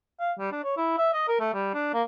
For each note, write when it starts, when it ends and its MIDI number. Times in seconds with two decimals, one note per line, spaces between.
0.19 0.32 77
0.39 0.51 55
0.52 0.59 62
0.64 0.75 73
0.77 0.94 64
0.98 1.10 76
1.13 1.28 75
1.28 1.40 70
1.40 1.51 57
1.54 1.72 55
1.74 1.93 62
1.94 2.03 58